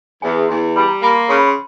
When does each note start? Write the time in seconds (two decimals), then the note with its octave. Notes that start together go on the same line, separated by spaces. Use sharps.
0.22 E2 G#5
0.49 E2 C6
0.76 G3 B5
0.88 A#5
1.02 A#3 B5
1.16 C6
1.28 C#3 C6
1.37 B5
1.47 C6